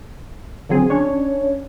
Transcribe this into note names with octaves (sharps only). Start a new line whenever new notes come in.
D3 F3 F#3 C4 G#4
C#4 D4 C#5